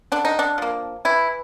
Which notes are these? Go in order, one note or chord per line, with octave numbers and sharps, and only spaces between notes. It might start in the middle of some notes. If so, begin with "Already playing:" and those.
D3 D4
D#4
D4
F3 A#3
E3 E4